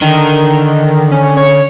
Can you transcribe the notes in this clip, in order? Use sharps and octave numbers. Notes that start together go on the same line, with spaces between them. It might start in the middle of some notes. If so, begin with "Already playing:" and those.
D3 D#3
C#4
C#5